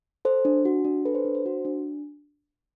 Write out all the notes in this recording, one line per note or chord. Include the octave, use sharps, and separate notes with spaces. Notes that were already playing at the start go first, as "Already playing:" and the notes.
A4 C5
D4
F#4
D4
A4 B4
C5
D4
C5
F#4
D4